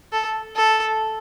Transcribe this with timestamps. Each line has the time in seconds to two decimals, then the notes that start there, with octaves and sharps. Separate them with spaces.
0.12 A4
0.56 A4